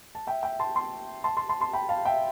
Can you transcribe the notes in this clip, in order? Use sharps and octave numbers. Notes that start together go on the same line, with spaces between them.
A5
E5 G5
E5 G5
A5 C6
A5 C6
A5 C6
A5 C6
A5 C6
A5 C6
G5 B5
F5 A5
E5 G5